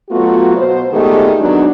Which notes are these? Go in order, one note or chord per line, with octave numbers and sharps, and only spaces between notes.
F#3 A3 B3 F4 F#4
B2 C5
A#2 D#3 G#3 A3 B3 G4
F#3 G#3 B3 D4 D#4 F#4